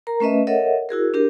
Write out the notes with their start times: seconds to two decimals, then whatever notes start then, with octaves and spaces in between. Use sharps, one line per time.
0.07 A#4 A#5
0.20 A3 C#4 B4 D#5 E5
0.47 A4 A#4 C#5 D#5 E5 F#5
0.89 E4 F#4 G#4 A#4
1.14 D4 G4 A#4